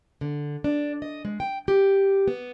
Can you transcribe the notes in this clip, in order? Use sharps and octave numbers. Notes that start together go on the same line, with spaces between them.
D3
D4
D#5
G#3
G5
G4
B3